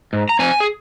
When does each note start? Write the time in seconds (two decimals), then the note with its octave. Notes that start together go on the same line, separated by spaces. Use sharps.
0.13 G#2
0.29 A#5
0.39 F3 C4 G#5
0.60 G#4